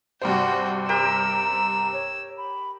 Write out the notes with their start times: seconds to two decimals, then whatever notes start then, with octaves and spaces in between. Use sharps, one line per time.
0.22 G2 C3 F#4 C5 G5
0.89 G4 A#4 G5 A#5 E6
1.93 C#5
2.37 B5